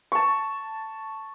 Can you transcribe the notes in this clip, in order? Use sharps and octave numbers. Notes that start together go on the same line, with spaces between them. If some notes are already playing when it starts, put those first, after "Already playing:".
A5 C#6